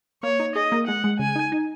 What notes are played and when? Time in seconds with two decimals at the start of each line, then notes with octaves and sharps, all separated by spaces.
0.23 A#3 C#5
0.40 D#4
0.55 G#4 D#5
0.72 A#3
0.87 G#3 F#5
1.04 G#3
1.19 C#3 G#5
1.35 D#4
1.52 D#4